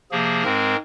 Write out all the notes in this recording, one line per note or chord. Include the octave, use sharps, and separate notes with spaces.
C3 F3 A#3 G#4
G#2 G#3 C4 A#4